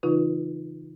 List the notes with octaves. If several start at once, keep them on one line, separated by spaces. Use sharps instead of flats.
C#3 E3 D#4 F4 B4